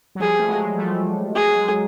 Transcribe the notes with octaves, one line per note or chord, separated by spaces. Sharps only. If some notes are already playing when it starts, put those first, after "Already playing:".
F#3
F3 G3 G#4
A3
F#3 G#3
G3 A3
F#3 G#3 G#4